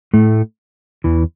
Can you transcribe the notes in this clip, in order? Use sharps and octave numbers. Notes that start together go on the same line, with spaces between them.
A2 A3
E2 E3